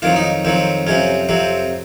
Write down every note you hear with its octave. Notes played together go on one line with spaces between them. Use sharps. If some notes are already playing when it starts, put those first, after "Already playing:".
F2 D#3 F#3 F4
D#4
F2 D#3 F#3 C4
F2 C3 F#3 C#4
F2 C3 F#3 C4